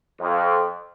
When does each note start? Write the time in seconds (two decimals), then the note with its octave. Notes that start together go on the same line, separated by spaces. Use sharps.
0.20 F2